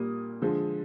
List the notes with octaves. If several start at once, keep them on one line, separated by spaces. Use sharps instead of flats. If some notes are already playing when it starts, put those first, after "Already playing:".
Already playing: A#2 G3 A#3 D#6
D3 F3 G#3